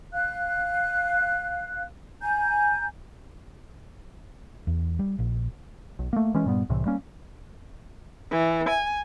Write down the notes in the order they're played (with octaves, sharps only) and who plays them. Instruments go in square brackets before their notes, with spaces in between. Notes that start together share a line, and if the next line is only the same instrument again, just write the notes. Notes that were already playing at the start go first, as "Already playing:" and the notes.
[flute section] F5 F#6
G#5 A#5 G6
[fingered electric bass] E2
G3
A#1
[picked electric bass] B1
A3 A#3
E3 G#3 C#4
G2 A#2 G3 B3
C2 A2 C3 E3
G3 A#3 C#4
[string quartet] E3
G#5